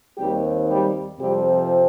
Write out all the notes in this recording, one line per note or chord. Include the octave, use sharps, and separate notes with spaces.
D#2 D#3 G3 C4 G4
G3 G4
F2 C3 F3 G3 C4 G4